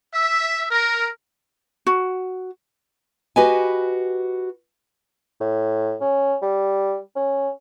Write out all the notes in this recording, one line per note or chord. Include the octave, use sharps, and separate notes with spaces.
E5
A#4
F#4
F#4 G4 B4 D#5 G#5
A2
C#4
G3
C#4